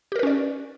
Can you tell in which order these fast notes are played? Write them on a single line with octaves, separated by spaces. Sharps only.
G4 A#4 B4 C#4 D5